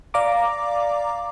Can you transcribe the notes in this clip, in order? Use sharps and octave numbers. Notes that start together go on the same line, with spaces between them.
D5 F5 A#5 D6